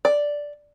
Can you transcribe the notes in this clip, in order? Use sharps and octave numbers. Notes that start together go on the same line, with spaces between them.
D5